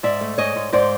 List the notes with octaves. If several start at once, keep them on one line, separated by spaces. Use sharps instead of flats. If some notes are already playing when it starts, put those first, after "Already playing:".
G#2 D5 E5
A3
G#2 C#5 D#5
G#2
G#2 C5 D5